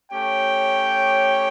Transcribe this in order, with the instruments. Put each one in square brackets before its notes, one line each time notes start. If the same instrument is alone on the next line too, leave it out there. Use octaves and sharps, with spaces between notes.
[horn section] A3 C#4 G4 C#5 [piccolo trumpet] G5